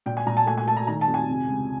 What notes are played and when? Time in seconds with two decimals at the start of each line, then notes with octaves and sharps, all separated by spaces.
0.06 A#2 G5
0.17 G#5
0.26 A#2 A#5
0.37 A5
0.46 A3 G#5
0.58 G#5
0.67 A3 A5
0.77 A#5
0.87 D#3 A#5
1.01 A5
1.08 F2
1.14 G#5
1.28 C3
1.48 C#2